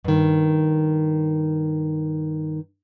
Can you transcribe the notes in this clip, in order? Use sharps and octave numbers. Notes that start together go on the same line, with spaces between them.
G2 D#3